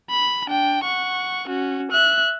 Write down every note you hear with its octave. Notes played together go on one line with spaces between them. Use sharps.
B5
D4 G5
F#5 C#6
C#4 F#4
E5 F#6